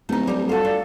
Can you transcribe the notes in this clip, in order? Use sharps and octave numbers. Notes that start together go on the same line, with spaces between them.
D1 A3 D#4
G3 D#4
F4 F#4 A4
D4